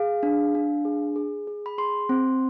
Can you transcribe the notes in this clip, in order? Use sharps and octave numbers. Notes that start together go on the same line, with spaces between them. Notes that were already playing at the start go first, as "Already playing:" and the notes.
Already playing: G#4 F5
D4
D4
G#4
G#4
G#4
B5
G#4 C6
C4